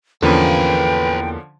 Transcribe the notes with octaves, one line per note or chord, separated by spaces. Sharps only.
E2 D3 F3 A#3 C#4 A4 B4 G5